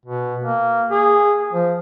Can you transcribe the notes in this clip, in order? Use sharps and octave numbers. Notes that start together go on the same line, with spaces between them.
B2
A#3
G#4
F3